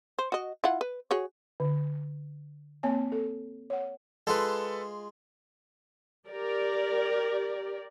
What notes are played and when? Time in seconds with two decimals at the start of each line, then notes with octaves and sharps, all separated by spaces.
0.19 C5
0.32 F#4 D#5
0.64 E4 F4 F#5
0.81 B4
1.11 F#4 G#4 C#5
1.60 D3
2.83 A#3 C4 C#5 G#5
3.12 A4
3.70 C#5 F#5
4.27 G#3 F4 A4 B4
6.28 G4 A#4 D5